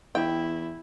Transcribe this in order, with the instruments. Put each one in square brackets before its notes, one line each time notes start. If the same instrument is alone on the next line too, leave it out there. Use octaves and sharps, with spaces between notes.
[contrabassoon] E2 [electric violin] E4 [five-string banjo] G5